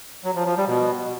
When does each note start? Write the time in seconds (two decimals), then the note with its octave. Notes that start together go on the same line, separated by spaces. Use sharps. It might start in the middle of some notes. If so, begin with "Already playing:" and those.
0.24 F#3
0.35 F3
0.46 F3
0.57 G3
0.68 B2